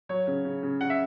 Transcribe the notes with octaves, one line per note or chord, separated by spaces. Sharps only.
F#3 C#5
C#3
C#3
C#3
C#3 F#5
E5